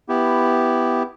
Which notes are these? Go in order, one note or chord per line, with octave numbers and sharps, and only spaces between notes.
B3 E4 G4